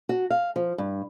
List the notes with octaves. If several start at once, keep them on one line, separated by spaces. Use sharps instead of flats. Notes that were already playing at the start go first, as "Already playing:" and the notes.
F#4
F5
F3
G2